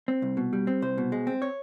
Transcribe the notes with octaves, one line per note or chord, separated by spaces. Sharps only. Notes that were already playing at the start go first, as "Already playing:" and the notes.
C4
C2
B2
G3
C4
C2 C5
B2
G#3
C4
C#5